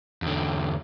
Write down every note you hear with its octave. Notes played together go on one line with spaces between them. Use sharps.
E2 D3